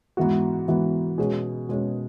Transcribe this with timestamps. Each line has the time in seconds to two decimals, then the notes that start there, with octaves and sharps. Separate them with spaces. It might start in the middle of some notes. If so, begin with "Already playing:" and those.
0.17 G#2 E3 B3 F#4
0.67 G#2 E3 B3 F#4
1.18 B2 G#3 C#4 G#4
1.69 B2 G#3 C#4 G#4